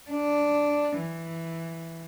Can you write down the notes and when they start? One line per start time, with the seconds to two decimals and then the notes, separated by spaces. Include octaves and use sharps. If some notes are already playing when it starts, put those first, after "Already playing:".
0.11 D4
0.98 E3